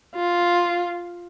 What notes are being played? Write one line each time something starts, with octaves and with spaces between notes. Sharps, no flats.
F4